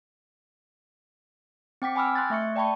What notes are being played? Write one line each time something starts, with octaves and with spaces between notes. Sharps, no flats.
C4 G5 D6 B6
G5 G#5 B5 D6 E6 F6
C6 F#6 G#6 A6
A3 E5 C#6 C#7
D5 G5 A5 B5 C#6